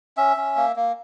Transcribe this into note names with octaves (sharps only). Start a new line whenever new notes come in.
C#4 E5
C#4
A#3
A#3